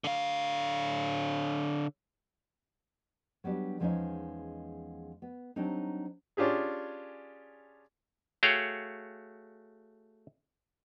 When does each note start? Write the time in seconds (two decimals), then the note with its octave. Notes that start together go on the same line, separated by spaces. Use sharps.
0.04 D3 F5
3.44 F#3 G3 B3 D4
3.80 E2 F3 G#3 C4 C#4 D#4
5.22 B3
5.56 F#3 G3 C4 D4 D#4
6.37 C#4 D4 F4 G4 G#4
8.43 A3 F#4 G#4 C#5 F5 G5